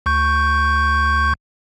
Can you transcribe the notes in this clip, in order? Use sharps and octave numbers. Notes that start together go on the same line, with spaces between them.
D2 C#6 G6